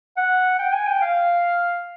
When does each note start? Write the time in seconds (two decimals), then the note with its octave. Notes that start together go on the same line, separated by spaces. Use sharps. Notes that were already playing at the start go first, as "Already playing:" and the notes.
0.17 F#5
0.59 G5
0.73 G#5
0.87 G5
1.02 F5